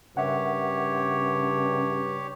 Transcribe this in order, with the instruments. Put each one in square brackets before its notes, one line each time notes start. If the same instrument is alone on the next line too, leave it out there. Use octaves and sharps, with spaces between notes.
[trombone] G2 [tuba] C#3 [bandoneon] G4 C#5 [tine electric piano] A#4 E5 F#5